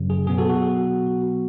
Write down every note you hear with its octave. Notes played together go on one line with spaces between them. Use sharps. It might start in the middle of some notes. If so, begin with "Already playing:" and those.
Already playing: F#2 C#3 F#3
G#4
B2 F#3 B3 G#4
F#4 A4
F#4